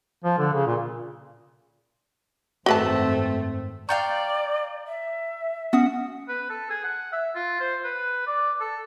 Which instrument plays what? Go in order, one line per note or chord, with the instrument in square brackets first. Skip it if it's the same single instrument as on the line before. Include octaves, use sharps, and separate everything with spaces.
[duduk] F3
D3
C#3
A#2
[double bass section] G#1 F#2 C4 [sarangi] A3 [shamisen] F#4 B4 A5
[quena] D5 [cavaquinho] F5 G5 C#6 [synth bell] A#5 G6 A6
[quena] E5
[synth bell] B3 C#4 D#6 [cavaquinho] F#4
[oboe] B4
A4
G#4
F#5
E5
F4
C5
B4
D5
A4